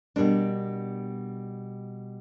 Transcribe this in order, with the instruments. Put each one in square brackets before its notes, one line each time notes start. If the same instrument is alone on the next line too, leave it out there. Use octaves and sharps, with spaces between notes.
[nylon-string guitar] B2 G3 A#3 D4